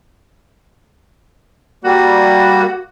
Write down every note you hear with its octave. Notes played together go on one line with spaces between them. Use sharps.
G3 A#3 F#4